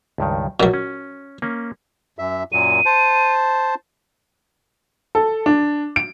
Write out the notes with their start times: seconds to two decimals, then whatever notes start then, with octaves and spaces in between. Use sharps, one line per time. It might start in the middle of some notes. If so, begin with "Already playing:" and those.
0.18 C#2 G2 D#3
0.60 B1 A#2 F#3 A3 C#4
0.74 C#4
1.42 A#3 C#4
2.19 F#2 E5
2.52 F#2 A#2 F#3 D#7
2.85 C5 A5
5.15 A4
5.46 D4
5.96 D7